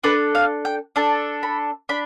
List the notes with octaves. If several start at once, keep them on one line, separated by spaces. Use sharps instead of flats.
D4 A4 B4
F5
G5
D4 A4 A5
B5
D4 B5